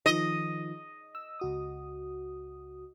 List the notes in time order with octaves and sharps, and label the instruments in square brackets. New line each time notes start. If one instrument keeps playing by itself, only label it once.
[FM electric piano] D#3 F3 [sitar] D#5
[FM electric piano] E6
C#2 F#4 D#6